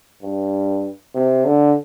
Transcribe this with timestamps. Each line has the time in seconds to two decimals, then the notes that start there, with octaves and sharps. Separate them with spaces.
0.22 G2
1.15 C3
1.45 D3